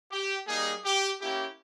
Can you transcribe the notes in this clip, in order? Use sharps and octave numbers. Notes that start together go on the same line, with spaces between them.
G4
G3 A#3 D#4 G#4
G4
A#3 C#4 E4 G4